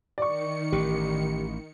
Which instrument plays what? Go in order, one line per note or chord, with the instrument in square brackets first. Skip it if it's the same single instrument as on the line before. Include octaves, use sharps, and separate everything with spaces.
[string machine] D#3 C#7 [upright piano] D5 C#6
[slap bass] A1 [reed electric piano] G4